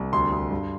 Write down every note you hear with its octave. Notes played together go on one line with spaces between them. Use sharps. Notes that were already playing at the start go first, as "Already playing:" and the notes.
Already playing: C2
D2 C6
D2
G2